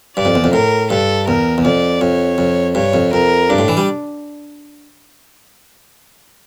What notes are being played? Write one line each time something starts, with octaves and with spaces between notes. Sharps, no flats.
G2 D5
F2
E2
F2
A2 A#4
G2 A4
E2 A#4
E2
F2 D5
F2 C#5
F2
G2 C#5
F2
F2 A#4
G2 D4
A2
E3
G3